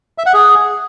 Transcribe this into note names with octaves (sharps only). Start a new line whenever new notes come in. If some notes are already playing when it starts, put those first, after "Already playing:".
E5
F#5
G#4